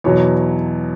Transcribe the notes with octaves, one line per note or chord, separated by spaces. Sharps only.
E2 B2 F#3 C#5